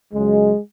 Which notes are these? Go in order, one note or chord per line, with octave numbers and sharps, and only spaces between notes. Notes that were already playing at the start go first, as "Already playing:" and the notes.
C#2 C#3 F#3 G#3